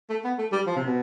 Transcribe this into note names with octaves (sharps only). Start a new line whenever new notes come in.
A3
B3
A3
G3
F3
C3
B2